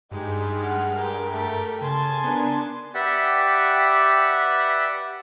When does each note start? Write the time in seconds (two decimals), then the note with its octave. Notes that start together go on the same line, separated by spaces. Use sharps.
0.11 G2 G#3 D#4 G4
0.60 F#5 F6
0.98 G4 A#4
1.29 A3 G4
1.81 C#3 G#5 A5 C6
2.24 B3 D4 A#4
2.95 G4 B4 D5 E5 F#5 G5